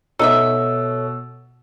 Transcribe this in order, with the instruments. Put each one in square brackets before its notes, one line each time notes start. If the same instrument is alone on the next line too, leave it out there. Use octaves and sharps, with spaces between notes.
[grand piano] B2 [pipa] D#4 D#5 E5 [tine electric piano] A4 C#5 [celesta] E6